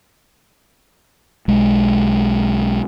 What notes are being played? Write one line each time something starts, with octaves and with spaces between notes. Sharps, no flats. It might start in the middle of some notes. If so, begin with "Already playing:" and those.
B1 G#3